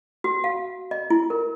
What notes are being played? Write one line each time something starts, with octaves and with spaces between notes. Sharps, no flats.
F#4
F5
D#5
E4
A#4